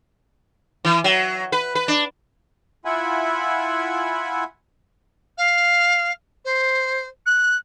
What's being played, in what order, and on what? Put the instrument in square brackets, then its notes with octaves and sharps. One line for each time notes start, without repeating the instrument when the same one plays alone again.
[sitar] E3
F#3
B4
B4
D4
[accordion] E4 F4 E5 F#5 G#5 B5
[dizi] F5
C5
F#6